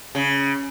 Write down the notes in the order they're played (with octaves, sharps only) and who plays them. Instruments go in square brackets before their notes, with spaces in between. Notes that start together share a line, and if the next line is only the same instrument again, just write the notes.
[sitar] C#3